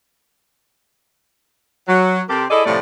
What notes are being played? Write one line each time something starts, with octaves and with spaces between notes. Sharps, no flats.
F#3
C3 C4 G4 A4 A#4
E4 G#4 A4 D5 D#5
A2 C3 F3 G3 A3 D5